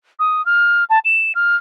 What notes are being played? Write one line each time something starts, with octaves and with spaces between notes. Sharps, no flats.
D#6
F6
A5
E7
F6